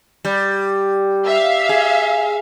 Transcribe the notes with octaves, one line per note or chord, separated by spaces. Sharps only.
G3
E5 F5
G#4